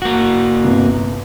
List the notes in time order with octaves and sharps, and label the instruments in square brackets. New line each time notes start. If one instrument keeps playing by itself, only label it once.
[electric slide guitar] A#3 F#4
[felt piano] G1 C2